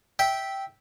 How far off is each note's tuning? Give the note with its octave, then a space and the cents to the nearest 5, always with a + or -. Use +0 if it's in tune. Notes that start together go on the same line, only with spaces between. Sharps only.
E5 -10 G5 -5